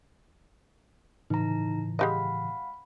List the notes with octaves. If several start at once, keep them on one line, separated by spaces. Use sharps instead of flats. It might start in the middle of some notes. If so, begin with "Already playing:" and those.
A2 C#3 E3 D#4 A#5
G#3 G4 D#5 F5 F#5 B5